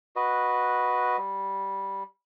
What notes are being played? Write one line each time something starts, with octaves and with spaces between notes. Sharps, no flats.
F#4 B4 D#5
G3